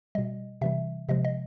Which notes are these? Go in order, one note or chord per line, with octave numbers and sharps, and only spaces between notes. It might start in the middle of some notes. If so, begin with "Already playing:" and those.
B2 G3 D#5
C3 E3 G3 E5
C3 F3 G#3 D#5
D#5